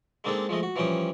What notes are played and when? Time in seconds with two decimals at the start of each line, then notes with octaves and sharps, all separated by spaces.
0.24 G#3 A#3 C4 D4 D#4 A4
0.49 F3 G#3 A3 D#5
0.63 F#4
0.76 E3 F3 G3 C#4 G5 D#6